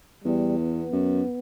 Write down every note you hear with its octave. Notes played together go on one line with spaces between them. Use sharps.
E2 G3
B3
F#2